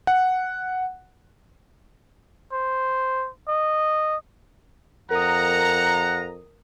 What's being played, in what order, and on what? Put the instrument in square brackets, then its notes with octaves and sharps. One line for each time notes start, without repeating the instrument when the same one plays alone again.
[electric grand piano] F#5
[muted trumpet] C5
D#5
[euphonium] F2 [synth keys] A#4 D#6 [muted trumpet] F#5 [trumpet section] A#5